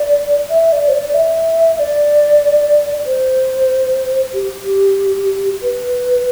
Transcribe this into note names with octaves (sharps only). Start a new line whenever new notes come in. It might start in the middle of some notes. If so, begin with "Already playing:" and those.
Already playing: D5
E5
D5
C5
D5
E5
D5
C5
G4
B4